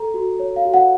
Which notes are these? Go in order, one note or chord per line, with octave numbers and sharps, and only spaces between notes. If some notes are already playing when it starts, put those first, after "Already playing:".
Already playing: A4 A#5
F#4
C#5
F5
F#4
F#5